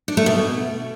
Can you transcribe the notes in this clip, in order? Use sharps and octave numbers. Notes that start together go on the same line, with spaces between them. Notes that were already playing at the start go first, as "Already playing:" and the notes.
D4
A3
B2